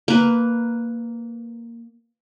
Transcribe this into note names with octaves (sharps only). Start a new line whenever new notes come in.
A#3 B4